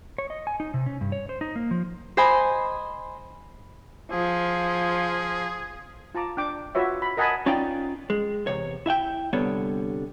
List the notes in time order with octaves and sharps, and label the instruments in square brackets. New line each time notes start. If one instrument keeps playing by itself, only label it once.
[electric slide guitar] C#5
D#5
G#5
D#4
C3
C#4
G2
C#5
C5
D#4
A#3
F3
[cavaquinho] C5 D#5 G#5 B5
[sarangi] F3 [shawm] G#4
[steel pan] F4 A5 A#5 D6
D4 G5 D6
F4 F#4 B4 C#5 E5
B5
A#4 D#5 F#5 G#5 A5 B5
[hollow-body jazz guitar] C#4 D#4 F4 D5 G5
G#3
E2 C3 C#5
E4 E5 F#5 G5
C2 D3 G3 B3 C#5